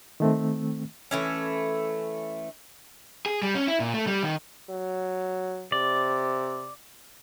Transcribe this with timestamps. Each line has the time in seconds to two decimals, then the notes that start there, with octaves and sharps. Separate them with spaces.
0.20 D#3 A3 C4
1.11 E3 A3 C#4
3.26 G#4
3.42 G3
3.55 C#4
3.68 E4
3.80 A#2
3.94 A3
4.07 G3
4.23 D#3
4.70 F#3
5.72 C3 D5